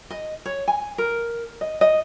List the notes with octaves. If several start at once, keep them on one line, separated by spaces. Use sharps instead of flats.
D#5
C#5
G#5
A#4
D#5
D#5